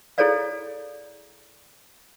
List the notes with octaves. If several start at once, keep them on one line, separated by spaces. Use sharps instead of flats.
E4 G#4 A4 C#5 D5 F5